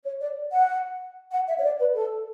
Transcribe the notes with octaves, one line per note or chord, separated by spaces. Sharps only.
C#5
D5
F#5
F#5
E5
C#5
D5
B4
A4